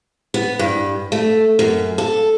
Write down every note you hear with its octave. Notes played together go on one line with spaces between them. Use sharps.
B3
G2
A3
F#2
A4